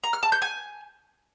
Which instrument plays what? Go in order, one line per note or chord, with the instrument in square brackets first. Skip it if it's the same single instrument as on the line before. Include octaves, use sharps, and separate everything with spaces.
[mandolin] A#5
F6
A5
G6
G#5